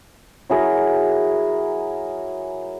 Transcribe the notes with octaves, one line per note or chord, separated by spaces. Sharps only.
F#3 E4 G#4 A#4